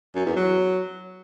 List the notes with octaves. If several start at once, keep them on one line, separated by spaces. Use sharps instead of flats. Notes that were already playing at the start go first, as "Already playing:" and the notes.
F#2
E2
F#3